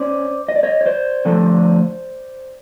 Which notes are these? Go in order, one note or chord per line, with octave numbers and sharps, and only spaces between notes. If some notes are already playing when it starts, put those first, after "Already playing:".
Already playing: C#4 C5 D5
D#5
D5
C#5 D#5
C#5
C5 D5
D3 F3 A3 D4